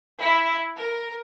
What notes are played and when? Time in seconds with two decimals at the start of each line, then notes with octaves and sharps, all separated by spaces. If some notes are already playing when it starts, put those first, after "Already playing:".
0.22 E4
0.77 A#4